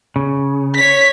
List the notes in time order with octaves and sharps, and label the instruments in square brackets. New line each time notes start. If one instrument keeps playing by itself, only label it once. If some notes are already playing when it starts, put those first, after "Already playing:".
[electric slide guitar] C#3
[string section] C#5 B6